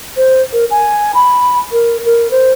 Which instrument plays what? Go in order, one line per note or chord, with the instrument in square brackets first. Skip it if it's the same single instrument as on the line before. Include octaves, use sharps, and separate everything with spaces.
[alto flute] C5
A#4
G#5
B5
A#4
A#4
C5